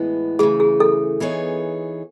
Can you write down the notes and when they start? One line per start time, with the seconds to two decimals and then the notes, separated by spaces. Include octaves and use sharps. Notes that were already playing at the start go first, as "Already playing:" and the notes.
Already playing: A2 E3 G#3 B3
0.39 C#3 E3 A3 G#4
0.60 G#4
0.80 A4
1.20 E3 B3 D#4 G#4 C#5